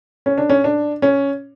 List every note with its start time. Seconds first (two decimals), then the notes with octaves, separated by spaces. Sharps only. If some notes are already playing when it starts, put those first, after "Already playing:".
0.26 C#4
0.38 D4
0.50 C#4
0.64 D4
1.02 C#4